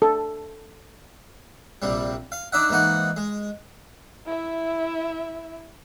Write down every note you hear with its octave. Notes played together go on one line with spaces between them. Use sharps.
A4
A#1 C3 G3
F5
D4 D#4 D5 E5 F#5
G#2 E3 A#3 D#4 F#5
G#3
E4 E5